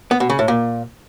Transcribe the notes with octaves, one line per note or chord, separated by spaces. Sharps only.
B3
B2
C#3
A2
A#2